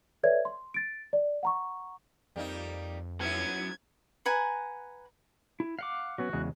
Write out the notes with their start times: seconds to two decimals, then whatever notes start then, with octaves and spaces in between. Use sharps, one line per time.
0.23 A4 B4 C#5 D5 E5 G#6
0.45 C6
0.74 A6 D7
1.13 D5
1.43 F#5 A#5 C#6
2.36 F2 G3 A#3 D#4
3.21 F#3 B3 C#4 E4 G#6
4.26 B4 F#5 G#5 A#5
5.60 E4
5.79 F5 F#5 D6
6.18 F#3 B3 C#4 F#4
6.33 E2 C#3 G#3